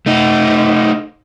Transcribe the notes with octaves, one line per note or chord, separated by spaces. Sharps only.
A3 D#4